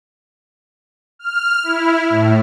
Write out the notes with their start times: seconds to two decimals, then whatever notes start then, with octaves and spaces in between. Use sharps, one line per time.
1.19 F6
1.63 E4
2.10 A2